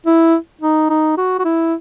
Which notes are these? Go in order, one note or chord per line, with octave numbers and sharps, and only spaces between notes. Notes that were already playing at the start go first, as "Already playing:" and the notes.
E4
D#4
D#4
F#4
F#4
E4